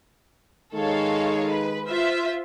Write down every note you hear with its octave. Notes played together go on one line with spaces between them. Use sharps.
D#3 G#3 D#4 A4 C#5 F5
B4
F4 C5 E5